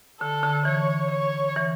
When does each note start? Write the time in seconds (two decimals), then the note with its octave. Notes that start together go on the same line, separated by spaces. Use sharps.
0.21 D3 A4
0.43 D3
0.65 E3 C#5
1.11 C#5
1.56 E3